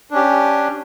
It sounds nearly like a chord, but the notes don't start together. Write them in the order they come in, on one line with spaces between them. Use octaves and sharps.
D4 C#4 G4